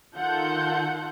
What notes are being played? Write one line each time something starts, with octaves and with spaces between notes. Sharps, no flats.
D#3 F4 A4 F#5 G6